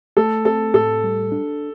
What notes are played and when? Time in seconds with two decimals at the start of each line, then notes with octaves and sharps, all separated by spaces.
0.17 A3 A4
0.45 C4 A4
0.74 A2 A4
1.03 G3
1.32 D4